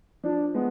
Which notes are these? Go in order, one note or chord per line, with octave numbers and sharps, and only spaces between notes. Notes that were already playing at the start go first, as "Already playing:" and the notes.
F3 D4
G#3 B3